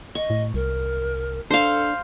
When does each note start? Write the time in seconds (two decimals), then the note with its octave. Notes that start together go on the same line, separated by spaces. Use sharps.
0.15 D#5 C#6
0.30 A2
0.54 C2 A#4
1.51 D4 A4 C5 F5